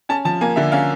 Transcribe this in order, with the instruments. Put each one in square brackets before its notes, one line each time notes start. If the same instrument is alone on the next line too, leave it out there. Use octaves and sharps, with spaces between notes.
[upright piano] C#4 A5
F3 A5
A#3 G#5
D3 E5
C#4 F5